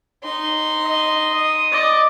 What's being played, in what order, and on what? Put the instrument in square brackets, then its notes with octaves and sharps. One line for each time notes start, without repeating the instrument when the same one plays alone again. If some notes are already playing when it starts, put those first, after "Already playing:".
[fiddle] D#4 C6
[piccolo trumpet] D#5
D#6
[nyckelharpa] D5 D#5